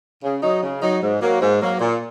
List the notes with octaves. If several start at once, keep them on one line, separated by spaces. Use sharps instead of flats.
C#3
F#3 D#4
C#3
F#3 D#4
G#2
F#3 A#3
G#2
F#3 A#3
A#2